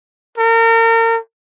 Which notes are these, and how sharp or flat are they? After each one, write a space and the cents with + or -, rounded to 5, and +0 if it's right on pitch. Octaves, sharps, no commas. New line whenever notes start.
A#4 -35